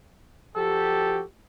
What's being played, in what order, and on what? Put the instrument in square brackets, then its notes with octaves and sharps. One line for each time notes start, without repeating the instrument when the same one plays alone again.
[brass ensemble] F3 F#4 G4 [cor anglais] A4